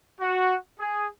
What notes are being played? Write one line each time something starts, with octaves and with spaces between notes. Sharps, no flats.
F#4
G#4